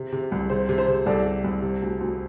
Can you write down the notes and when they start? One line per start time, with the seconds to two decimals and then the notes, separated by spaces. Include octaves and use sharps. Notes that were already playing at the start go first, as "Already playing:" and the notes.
Already playing: C3
0.12 C3
0.32 C2
0.50 C3 C5
0.69 C3
0.78 C5
0.87 C3
1.06 C2 A4 D5
1.25 C3
1.44 C2
1.62 C3
1.82 D2
2.01 D2